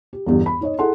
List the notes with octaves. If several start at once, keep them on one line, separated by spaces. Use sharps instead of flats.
G4
G1 E2 G2
B5
D#4 C#5 D#5
E4 G#4 A4 F#5 C6